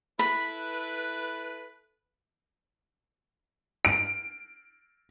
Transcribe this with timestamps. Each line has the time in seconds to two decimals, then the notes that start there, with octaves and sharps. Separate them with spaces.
0.19 E4 A4 B4 B5
3.85 D7